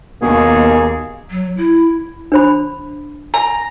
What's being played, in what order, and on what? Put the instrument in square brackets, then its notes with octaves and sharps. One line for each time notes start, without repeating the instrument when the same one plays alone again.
[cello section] D#2 [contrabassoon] B2 [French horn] A#3 [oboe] G#4
[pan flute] F#3
E4
[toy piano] D4 C5 B5
[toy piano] G#5 [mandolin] A#5